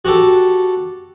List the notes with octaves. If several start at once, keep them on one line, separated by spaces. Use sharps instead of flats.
F#4 G4 A4